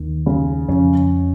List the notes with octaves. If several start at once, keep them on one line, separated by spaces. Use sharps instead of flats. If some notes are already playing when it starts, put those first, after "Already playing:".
Already playing: D#2 D#3
C#3
F2 F3 C#4